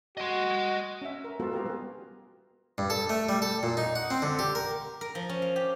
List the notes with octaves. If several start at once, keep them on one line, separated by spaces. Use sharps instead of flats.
F#4 D#5 C6
C#4 E5
A#4
G#3 B3 F4 F#4 A4
B3 F4 G4 A#4
G3 G#4
G2
A4
A3
G3
A4
A#2
D#4
F#5
C4
D3
G4
A#4
A#4
F3
C#4
F5
G4